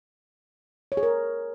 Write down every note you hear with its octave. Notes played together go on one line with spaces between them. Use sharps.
C#5
G#4
A#4